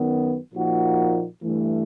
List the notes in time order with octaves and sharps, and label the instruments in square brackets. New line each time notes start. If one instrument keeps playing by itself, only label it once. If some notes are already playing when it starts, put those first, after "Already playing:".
Already playing: [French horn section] F#2 D#3 F#3 B3
A#2 F3 A#3 D#4 F#4
G2 E3 A3